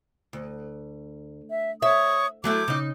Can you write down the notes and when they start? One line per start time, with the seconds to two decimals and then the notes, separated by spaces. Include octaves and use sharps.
0.33 D2
1.49 E5
1.82 C#5 E5 C#6 D#6
2.44 F#3 A3 E4 D6 G6
2.68 C#3 D#4